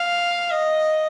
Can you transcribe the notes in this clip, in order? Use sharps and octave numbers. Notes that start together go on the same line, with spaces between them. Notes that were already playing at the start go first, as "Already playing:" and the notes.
Already playing: F5
D#5